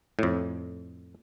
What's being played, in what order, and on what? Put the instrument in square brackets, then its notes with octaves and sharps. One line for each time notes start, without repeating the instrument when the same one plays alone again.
[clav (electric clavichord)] F2 A2